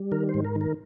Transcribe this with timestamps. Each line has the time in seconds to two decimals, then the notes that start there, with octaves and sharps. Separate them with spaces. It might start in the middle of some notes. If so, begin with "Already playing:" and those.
Already playing: G3
0.12 D#3 A#4
0.29 C5
0.34 G#2
0.45 A#4
0.56 D#3
0.61 A#4